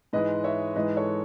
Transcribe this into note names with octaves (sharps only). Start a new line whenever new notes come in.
G#2 E3 G#3 B4 D#5
C#5 E5
G#2 E3 G#3 B4 D#5
A4 C#5